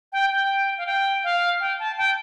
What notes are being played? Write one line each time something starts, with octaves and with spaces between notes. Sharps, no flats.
G5
G5
F5
G5
F5
G5
A5
G5